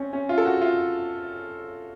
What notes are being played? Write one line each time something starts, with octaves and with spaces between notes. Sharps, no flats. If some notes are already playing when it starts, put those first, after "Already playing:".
Already playing: C4 C#4
C#4
F4
A4
F#4
F4